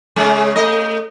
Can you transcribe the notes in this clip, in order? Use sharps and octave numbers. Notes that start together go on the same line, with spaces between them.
C#3 G#3 C#4
A3 D#5